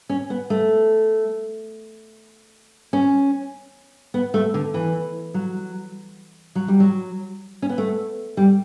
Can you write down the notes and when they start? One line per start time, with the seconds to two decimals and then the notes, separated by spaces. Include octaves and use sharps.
0.09 C#4
0.30 B3
0.50 A3
2.93 C#4
4.14 B3
4.34 A3
4.54 D3
4.74 E3
5.34 F#3
6.55 F#3
6.68 G3
6.80 F#3
7.62 C#4
7.69 B3
7.78 A3
8.37 G3